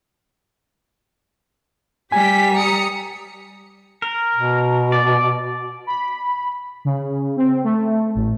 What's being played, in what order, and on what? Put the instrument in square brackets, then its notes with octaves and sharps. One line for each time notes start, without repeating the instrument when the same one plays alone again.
[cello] G3 [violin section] G4 B6 [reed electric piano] G#5
[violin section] A#5 D#6 C#7
[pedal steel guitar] A#4
[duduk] B2
[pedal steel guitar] D5
[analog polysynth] B5
C#3
C4
A3
A1